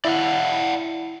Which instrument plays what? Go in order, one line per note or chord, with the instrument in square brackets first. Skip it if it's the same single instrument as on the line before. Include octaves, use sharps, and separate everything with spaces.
[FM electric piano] E4 [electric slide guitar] D5 F5 F#5